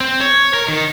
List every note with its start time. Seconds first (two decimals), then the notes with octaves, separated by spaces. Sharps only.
0.01 C4
0.21 C#5
0.54 A#4
0.68 D#3